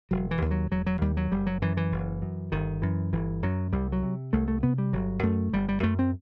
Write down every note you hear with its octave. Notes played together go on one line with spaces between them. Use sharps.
E1 F#3
E3
D#2
F#3
E1 F#3
F#3
D#2 G3
F#3
F#1 G3
F#3
F#2 E3
E3
F#1
F#2
G1 D#3
F#2 E3
G1 E3
F#2 F#3
C2 G3
F#3
C3
C2 A3
A3
C3 B3
G3
G1 F#3
F#2 A3
G1 G3
G3
F#2 A3
C4